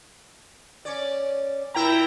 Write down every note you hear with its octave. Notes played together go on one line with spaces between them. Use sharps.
C#4 C#5 D5
A#2 E4 G5 A#5